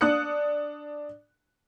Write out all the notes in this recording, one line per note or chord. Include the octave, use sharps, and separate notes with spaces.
D4 D#6 F#6 C#7